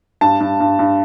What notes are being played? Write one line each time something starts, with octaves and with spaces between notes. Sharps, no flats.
G2 A5
G2
G2
G2